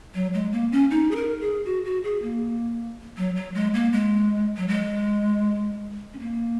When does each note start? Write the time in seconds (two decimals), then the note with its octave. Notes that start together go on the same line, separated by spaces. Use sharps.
0.14 F#3
0.34 G#3
0.52 A#3
0.72 C#4
0.91 D#4
1.11 G#4
1.16 A#4
1.41 G#4
1.65 F#4
1.85 F#4
2.04 G#4
2.22 A#3
3.17 F#3
3.36 F#3
3.54 G#3
3.74 A#3
3.93 G#3
4.57 F#3
4.68 G#3
6.13 C#4
6.19 A#3